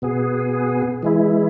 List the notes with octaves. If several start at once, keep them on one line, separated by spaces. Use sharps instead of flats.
B2 B3 G#4
E3 G#3 E4